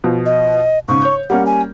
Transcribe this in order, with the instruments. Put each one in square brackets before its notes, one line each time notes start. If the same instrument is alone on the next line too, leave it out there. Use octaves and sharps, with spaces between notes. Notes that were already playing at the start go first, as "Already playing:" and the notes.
[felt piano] B2 F3
[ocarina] D#5
[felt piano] G#2 C#3 [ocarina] C#6
[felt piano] C#5 G6
[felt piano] G3 A#3 C#4 [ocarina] F#5
[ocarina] G#5